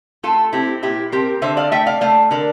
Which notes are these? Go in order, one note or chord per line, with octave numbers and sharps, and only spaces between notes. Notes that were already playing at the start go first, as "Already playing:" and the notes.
A3 F4 A4
C4 E4 G4
A#2 E4 G4
C4 G4 A#4
D3 C5 E5
D5 F5
A3 E5 G5
D5 F5
A3 D5 F5
D3 A#4 D5